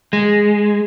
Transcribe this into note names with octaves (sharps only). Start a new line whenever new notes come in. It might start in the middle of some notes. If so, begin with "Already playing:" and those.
G#3